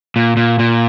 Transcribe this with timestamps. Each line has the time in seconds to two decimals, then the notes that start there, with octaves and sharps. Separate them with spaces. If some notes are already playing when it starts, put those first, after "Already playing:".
0.16 A#2
0.37 A#2
0.59 A#2